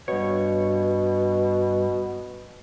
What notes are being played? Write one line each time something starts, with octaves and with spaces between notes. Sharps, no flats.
G2 B2 C#5